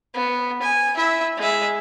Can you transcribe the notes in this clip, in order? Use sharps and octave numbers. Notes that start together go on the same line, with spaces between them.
B3
G#5
E4 E5
G#3 E5